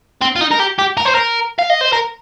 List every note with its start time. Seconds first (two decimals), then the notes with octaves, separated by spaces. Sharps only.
0.22 C4
0.36 F4
0.41 D#4
0.51 A#4
0.59 G4
0.79 G4
0.98 A#4
1.06 C5
1.15 A#4
1.59 F5
1.70 D#5
1.81 C5
1.93 A#4